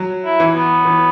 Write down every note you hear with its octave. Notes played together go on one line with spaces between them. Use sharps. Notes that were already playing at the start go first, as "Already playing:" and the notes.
Already playing: F#3
E4
E3
B3
E3